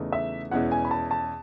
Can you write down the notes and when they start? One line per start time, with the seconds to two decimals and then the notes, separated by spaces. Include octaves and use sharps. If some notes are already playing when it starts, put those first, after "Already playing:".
Already playing: E2 C#3 E3 A3 D#4
0.12 E5
0.51 E2 B2 G#3 C#4 E4 F#5
0.72 G#5
0.85 B5
0.91 A5
1.11 A5